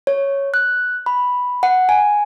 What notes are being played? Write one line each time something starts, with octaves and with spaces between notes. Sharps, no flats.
C#5
F#6
B5
F#5
G#5